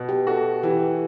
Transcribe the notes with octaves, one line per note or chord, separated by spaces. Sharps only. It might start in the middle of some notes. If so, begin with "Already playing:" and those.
Already playing: B2
G4
F#4 A4
E3 G4